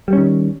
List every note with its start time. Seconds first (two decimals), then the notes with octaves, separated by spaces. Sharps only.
0.08 G3
0.13 C#4
0.18 D#3